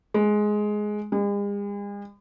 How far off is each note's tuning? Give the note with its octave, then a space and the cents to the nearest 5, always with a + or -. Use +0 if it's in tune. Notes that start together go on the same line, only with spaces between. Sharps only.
G#3 +10
G#3 -45